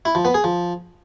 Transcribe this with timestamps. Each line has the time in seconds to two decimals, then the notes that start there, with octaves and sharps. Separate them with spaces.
0.05 E4
0.15 F3
0.25 B3
0.34 G#4
0.44 F3